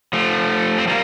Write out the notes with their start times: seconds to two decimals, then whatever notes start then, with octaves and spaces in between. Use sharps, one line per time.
0.13 F3 A3
0.78 C4
0.87 G3 A#3